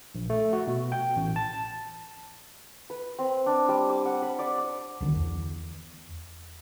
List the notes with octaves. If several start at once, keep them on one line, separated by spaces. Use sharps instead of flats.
A#1
A3
F#4
B2
G5
A1
A5
B4
C4
D4
G3
D6
F#5
B5
D5
D6
C2 D3 D#3
E2